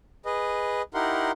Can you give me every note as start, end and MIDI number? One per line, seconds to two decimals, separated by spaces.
0.25 0.82 68
0.25 0.82 71
0.25 0.82 75
0.94 1.31 63
0.94 1.31 64
0.94 1.31 67
0.94 1.31 70
0.94 1.31 78
0.94 1.31 84